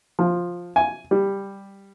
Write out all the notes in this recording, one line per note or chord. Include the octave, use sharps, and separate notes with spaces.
F3
G#5
G3